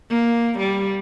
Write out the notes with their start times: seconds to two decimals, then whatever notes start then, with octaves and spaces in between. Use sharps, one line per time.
0.10 A#3
0.59 G3